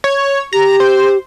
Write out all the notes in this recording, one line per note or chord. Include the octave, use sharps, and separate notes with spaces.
C#5
G4 A#5
C5